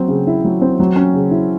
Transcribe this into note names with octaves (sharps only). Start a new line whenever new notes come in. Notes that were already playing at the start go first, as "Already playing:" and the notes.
Already playing: F#3 C4
C#3
E4
F#3
C4
F#3
C#4
C#3
E4